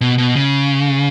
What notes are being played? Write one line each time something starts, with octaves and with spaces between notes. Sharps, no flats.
B2
B2
C#3